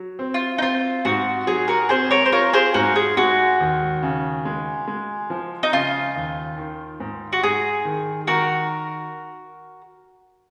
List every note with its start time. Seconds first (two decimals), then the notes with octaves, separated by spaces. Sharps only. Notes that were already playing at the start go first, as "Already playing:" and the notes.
Already playing: F#3
0.19 C4
0.34 F4
0.58 D#4
0.62 C4 F4
1.05 G#2 F#4
1.47 F#3 G#4
1.68 F#4 A#4
1.89 C4 G#4 C5
2.11 A#4 C#5
2.25 C5
2.32 F4 A#4 C#5
2.53 G#4 C5
2.74 G#2 F#4 A#4
2.96 G#4
3.17 G#3 F#4
3.60 D#2
4.02 C#3
4.45 G#3
4.88 G#3
5.30 F3
5.63 D#4
5.72 C#3 F4
6.16 D#2
6.58 D#3
7.00 G#2
7.33 F#4
7.43 G#2 G#4
7.85 D#3
8.27 D#3 F#4 A#4